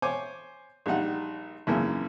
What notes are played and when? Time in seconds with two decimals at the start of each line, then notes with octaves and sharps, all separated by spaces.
0.02 C5 C#5 G#5 D6
0.86 A#1 G3 D#4 F#5
1.67 G#1 F#2 C#3 E3 A#3